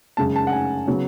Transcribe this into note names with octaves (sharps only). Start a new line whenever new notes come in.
F#2 C#3 G#3 A5
A5
F#5
G#5
C#3 F#3 B3